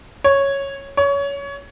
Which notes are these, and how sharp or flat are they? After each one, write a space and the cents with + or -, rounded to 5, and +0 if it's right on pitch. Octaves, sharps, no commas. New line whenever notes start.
C#5 -5
C#5 +20